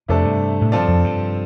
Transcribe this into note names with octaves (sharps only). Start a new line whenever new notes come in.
F2 C3 A3 D4 A4 D5
G2
A2
G2 F3 C4 F4 A4 D5
F2
G2